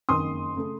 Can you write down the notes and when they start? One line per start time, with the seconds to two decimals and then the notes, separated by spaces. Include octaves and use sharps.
0.09 F#1 F2 D#3 A#3 C6 D#6
0.56 C#3 A3